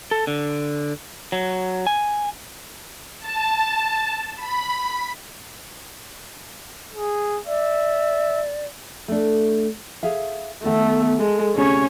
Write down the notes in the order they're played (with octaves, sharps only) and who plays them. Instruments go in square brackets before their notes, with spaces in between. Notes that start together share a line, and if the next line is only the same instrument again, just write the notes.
[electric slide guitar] A4
D3
F#3
G#5
[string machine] A5
B5
[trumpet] G#4
[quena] D5 [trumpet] E5
[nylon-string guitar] A3 D4
G#4 E5 F5
[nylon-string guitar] D#3 B3 A4 [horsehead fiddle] A3
[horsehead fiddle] G#3 [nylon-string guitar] A4
[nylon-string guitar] D2 C3 G#4 [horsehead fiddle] C#4 C#5